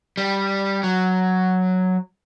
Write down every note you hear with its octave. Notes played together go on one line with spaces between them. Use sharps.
G3
F#3